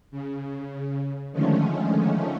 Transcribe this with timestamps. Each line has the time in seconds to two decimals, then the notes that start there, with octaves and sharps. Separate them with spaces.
0.11 C#3
1.32 D3 D#3 F3 G#3 A3 C#4